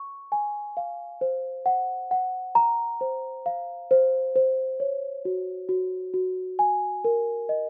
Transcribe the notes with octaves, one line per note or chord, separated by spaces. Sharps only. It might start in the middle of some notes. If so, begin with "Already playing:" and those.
Already playing: C#6
G#5
F5
C5
F#5
F#5
A#5
C5
F5
C5
C5
C#5
F#4
F#4
F#4
G#5
A#4
D#5